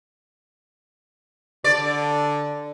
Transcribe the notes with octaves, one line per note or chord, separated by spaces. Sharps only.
D3 D5